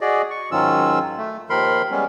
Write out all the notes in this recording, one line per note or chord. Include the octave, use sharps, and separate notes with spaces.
F#4 G#4 D5 D#5
C#6
G#2 D#3 F#3 C#4 F4 E6
A3
D#2 D#3 F3 A#4 B5 C6
G3 G#3 B3 C#4